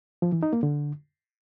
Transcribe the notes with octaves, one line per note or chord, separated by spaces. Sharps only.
F3
E3
D#4
A#3
D3